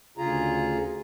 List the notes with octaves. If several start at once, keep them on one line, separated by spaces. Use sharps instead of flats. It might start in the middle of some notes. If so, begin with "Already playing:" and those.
D2 C#3 F4 G#4 A#5